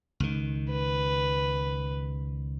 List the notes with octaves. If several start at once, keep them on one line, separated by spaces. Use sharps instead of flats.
C#2 D#3
B4